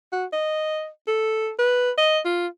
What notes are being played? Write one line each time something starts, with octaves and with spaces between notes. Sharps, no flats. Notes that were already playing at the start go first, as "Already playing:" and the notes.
F#4
D#5
A4
B4
D#5
F4